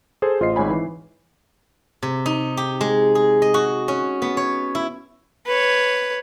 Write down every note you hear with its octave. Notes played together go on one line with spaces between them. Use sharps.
G#4 A4 C5
A1 F4 C5 D#5 C7
G#1 G#2 C#5 G#5 B5
E3
C3
D#4
G4
G#3
G#4
D#5
F#4
C#4
B3
C#5
E4
B4 C#5